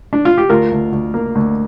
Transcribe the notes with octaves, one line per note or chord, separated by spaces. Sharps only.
D4
F4
G4
D2 F4 A#4
D2
D2
A#3
D2